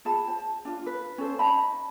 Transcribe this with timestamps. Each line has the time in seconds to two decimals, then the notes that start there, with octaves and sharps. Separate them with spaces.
0.05 F4 G#4 A5 B5
0.28 C5 A5
0.65 D4 F4
0.82 F4 B4
1.18 C#4 A4 C5
1.39 D#4 D#5 A5 B5